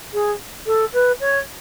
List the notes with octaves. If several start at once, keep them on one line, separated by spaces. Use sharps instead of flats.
G#4
A4
B4
C#5